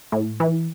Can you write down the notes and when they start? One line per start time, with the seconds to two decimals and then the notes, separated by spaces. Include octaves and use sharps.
0.12 A2
0.40 E3